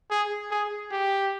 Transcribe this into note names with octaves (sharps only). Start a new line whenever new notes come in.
G#4
G#4
G4